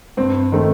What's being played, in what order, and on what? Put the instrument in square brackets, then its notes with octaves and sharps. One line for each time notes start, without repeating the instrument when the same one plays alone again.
[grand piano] G2 C4
D#3 A3 C4